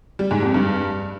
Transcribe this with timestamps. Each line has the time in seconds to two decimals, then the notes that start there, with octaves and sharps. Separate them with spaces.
0.19 G3
0.31 G#2
0.43 F2
0.54 G2